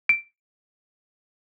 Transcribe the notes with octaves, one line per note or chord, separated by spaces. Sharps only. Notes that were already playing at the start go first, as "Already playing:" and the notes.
D7